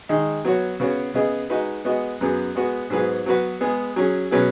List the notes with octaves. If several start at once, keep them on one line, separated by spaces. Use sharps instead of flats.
D#3 G#3 D#4 G#4
F#3 B3 F#4 C#5
C#3 B3 F#4 C#5
C#3 B3 G#4 D#5
G#3 D#4 F#4 B4 D#5
G#3 B3 F#4 D#5
F#2 F#3 B3 G#4
G#3 B3 F#4
G#2 F#3 B3 G#4 B4
F#3 B3 F#4 B4
G#3 B3 G#4
F#3 C#4 G#4
B2 F#3 C#4 G#4 B4